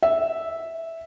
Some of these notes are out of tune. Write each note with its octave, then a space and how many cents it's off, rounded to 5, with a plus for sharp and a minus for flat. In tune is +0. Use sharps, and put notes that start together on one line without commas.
E5 -5